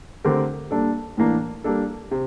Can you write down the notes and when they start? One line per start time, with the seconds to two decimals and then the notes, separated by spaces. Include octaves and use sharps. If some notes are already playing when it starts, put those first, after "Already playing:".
0.25 D3 A3 C4 G4 A#4
0.71 A#2 G3 D4 A4
1.17 A2 E3 A#3 D4
1.64 G3 A#3 D4 A4
2.11 C3